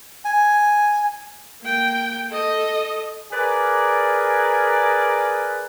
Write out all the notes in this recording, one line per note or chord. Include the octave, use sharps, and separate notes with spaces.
G#5
A#3 G5
A4 D#5
G#4 A#4 B4 D5